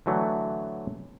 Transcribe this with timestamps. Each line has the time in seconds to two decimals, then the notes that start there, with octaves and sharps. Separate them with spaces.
0.06 D3 E3 F#3 A3